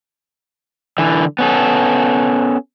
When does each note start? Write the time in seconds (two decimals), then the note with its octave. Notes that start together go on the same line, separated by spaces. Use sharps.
0.98 D3 E3
1.39 B3 C#4 A4